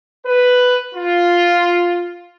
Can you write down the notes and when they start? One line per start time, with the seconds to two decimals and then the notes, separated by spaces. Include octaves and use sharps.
0.24 B4
0.94 F4